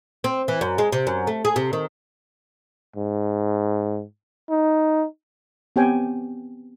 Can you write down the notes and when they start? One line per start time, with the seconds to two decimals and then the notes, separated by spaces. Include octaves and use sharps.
0.24 C4
0.48 E3
0.61 F#2
0.78 G#3
0.92 C3
1.07 F#2
1.27 A3
1.45 G#4
1.56 C3
1.73 D#3
2.96 G#2
4.50 D#4
5.76 B3 C4 G4 C#5 G5 G#5